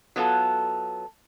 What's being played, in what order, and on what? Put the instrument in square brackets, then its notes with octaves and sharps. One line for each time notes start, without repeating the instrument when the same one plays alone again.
[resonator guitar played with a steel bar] F#3 B3 F4 A4